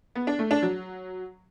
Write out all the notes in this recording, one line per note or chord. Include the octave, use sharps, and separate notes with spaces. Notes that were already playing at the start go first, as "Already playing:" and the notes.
B3
D4
A3
D4
F#3